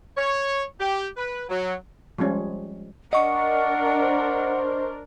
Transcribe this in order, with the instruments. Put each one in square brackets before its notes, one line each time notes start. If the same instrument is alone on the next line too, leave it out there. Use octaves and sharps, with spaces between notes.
[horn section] C#5
G4
B4
F#3
[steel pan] F3 G3 G#3 C#4
[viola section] D4 A#4 [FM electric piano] D#5 C#6 [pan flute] F#5
[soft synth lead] C5